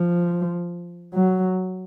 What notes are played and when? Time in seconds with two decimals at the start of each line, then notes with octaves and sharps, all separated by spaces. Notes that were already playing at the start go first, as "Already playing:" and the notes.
Already playing: F3
1.14 F#3